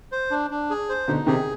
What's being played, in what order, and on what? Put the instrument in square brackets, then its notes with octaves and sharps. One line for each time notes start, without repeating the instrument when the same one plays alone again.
[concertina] C5
D4
D4
G#4
C5
[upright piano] B2 D3 [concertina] D#4
[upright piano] C3 D#3 [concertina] G#4